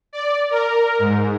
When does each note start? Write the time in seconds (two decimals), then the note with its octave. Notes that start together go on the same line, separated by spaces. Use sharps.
0.13 D5
0.50 A#4
0.99 G#2